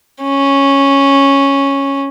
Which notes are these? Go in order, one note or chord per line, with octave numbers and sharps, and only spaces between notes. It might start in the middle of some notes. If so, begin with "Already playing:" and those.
C#4